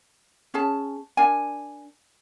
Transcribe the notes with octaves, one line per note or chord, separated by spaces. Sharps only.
C#4 G#4 A5
D4 A#4 G#5